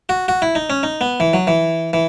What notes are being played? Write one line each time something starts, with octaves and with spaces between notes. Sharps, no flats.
F#4
F#4
E4
D#4
C#4
D#4
B3
E3
F#3
E3
E3